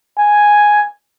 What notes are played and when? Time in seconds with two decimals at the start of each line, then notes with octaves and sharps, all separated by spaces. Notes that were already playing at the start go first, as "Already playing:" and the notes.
0.18 G#5